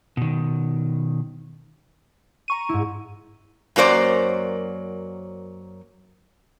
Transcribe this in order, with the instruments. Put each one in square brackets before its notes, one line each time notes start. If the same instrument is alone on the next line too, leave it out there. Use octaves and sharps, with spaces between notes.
[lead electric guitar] B2 D#3
[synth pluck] A#5 C#6 D#7
[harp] G#2 E4
[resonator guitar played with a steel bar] F#2 F#3 A#3 C5 D5